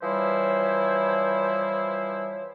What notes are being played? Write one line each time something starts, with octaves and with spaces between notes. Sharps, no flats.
E3 F3 G3 E4 C5 C#5